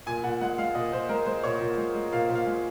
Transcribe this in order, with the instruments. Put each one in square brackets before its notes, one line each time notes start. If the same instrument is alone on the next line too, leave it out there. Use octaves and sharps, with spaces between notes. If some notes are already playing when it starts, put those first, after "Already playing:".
[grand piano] A#2 G#5
A#2 F#5
G#3 F#5
G#3 F5
A#2 D#5
A#2 C5
G#3 A#4
G#3 C5
A#2 C#5
A#2
G#3
G#3
A#2 F5
A#2
F5
G#3